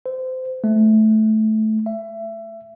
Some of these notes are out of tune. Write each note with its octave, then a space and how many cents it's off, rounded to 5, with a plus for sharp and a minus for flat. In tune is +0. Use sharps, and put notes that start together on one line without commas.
C5 -25
A3 -15
E5 +25